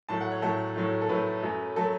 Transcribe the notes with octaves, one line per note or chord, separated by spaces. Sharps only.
A2 F#3 A3 A5
F#5
C#5
A2 F#3 A3 A4
A2 F#3 A3
A4
A2 F#3 A3 B4
F#2 F#3 A3
F#3 A3 A4